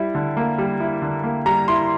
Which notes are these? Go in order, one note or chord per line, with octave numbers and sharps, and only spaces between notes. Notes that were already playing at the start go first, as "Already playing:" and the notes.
Already playing: G3 E4
D3
A#3
G3
E4
D3
A#3
G3 A#5
E4 C6